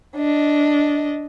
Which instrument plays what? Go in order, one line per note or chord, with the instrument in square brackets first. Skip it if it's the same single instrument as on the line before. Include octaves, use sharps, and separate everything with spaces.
[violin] D4 D#5